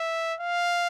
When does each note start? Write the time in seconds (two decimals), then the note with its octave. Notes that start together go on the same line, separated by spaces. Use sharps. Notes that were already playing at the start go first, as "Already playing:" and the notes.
Already playing: E5
0.40 F5